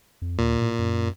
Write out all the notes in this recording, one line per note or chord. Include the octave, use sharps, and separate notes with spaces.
F2
D#2 A#2
A2
F#2